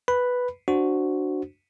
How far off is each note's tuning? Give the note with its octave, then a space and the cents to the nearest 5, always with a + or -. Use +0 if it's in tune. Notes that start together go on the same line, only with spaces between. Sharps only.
B4 +0 B5 +0
D4 +0 F#4 +0 C5 +0